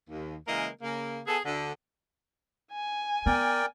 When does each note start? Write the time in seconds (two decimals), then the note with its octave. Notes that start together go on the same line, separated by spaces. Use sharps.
0.09 D#2
0.48 C#3 E3 G#3 A#3 A#4 D#5
0.82 C#3 A#3
1.27 B3 G#4 A4
1.45 D2 D3
2.72 G#5
3.26 B3 A#4 D5 G5